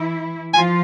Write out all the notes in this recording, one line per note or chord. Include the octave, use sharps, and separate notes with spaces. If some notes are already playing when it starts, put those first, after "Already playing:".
Already playing: E3 E4
F3 F4 G#5